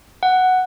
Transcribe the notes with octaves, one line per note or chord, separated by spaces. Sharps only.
F#5